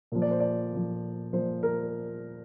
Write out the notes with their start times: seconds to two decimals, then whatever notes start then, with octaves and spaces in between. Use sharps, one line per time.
0.12 A#2 F3
0.22 D5
0.31 C5
0.40 D5
0.73 A#2 F3
1.33 A#2 F3 C5
1.63 A#4